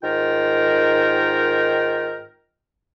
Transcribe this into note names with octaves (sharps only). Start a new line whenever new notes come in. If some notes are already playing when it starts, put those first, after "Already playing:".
G#2 D#3 F4 A#4 G5